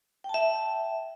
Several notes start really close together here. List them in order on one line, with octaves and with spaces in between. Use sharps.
G5 A5 E5